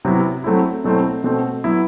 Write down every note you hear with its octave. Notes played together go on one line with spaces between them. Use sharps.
C3 F#3 B3 E4
F#3 A3 C4 E4
B2 F#3 A3 C4 E4
B2 A3 C4
F#3 B3 E4